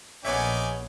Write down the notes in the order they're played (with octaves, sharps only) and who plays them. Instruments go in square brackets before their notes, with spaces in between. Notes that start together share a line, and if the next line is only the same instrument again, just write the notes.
[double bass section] A#1 [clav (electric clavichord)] B3 C#5 E5 [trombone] C#4 [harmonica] D#4 D5 G#5